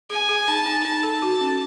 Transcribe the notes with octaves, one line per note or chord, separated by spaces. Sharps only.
G#4 G#5
G#4
D#4 A5
D#4
D#4 A5
A4
F#4
C#4